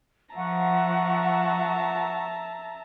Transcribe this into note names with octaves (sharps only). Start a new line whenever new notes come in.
F3 E5 F#5 A5 A#5 C#6